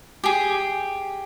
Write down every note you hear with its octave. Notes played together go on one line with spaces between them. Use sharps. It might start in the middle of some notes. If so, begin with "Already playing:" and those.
G4 G#4